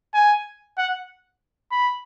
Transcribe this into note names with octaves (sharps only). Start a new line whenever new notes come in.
G#5
F#5
B5